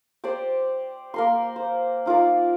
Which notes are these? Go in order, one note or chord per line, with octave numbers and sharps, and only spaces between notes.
G4 C5 D5
A#3 A#4 C6
C5
D#4 F4 A#4 D5